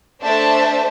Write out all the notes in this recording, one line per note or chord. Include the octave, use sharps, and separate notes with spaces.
A3 D4 C5 E5 A5